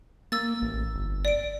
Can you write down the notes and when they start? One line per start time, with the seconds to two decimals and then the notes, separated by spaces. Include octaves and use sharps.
0.32 A#3 E6 A6
0.62 A1
0.95 G1
1.25 D5 D7